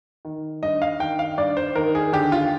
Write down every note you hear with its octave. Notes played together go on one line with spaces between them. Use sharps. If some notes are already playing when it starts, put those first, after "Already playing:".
D#3
G2 D#5
F5
D#3 G5
F5
G2 D5
C5
D#3 A#4
G#4
D3 G4
F4